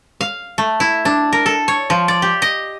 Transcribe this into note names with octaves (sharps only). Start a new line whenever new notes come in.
F5
A3
E4
D4
A#4
A4
C#5
F3
D5
G4
D#5